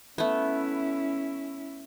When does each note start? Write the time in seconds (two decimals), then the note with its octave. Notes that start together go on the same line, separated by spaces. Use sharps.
0.18 A3 B3 C#4 E4